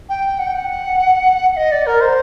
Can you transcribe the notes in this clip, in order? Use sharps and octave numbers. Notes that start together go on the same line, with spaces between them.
G5
F#5
G5
F#5
F#5
D#5
D5
A#4
C5